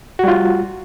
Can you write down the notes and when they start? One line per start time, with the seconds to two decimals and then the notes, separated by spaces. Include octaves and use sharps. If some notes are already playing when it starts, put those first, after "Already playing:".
0.19 F#4
0.24 G3
0.28 F4